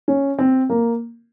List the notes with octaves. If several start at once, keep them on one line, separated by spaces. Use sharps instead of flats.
C#4
C4
A#3